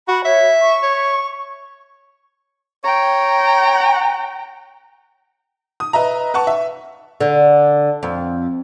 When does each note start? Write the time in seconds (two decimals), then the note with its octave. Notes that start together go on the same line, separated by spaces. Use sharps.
0.08 F#4 B5
0.25 C#5 E5
0.62 C#6
0.83 C#5
2.84 C#5 G5 A#5
5.80 D#6
5.93 B4 D#5 E5 A#5
6.34 B4 F#5 A5 C#6
6.47 E5
7.20 D3
8.03 F2